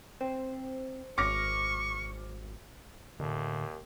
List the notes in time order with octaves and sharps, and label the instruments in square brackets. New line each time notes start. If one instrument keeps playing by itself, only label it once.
[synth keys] C4 [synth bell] C5
[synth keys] G#1 [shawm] C#6 [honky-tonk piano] D6 F6 A#6
[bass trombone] D#2 [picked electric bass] A2 D3